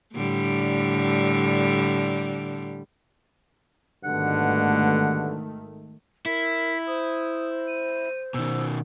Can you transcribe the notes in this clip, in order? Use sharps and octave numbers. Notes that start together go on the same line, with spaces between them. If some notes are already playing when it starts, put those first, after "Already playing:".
A2 D3 G3
G#1 G2 B2 D3 D#3 A3 F#5
E4 A#4 B6
C5 D#6
D#7
B2 D#3 E6